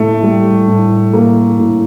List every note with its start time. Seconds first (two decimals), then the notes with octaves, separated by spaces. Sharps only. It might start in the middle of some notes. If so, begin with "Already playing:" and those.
Already playing: A2 A3 A#3
0.23 G3
0.68 A2
1.13 A#3
1.59 A2